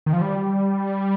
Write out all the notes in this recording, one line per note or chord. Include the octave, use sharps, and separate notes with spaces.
D#3
F3
G3